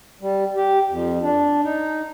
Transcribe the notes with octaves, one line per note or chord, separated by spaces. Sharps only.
G3
G4
F2
D4
D#4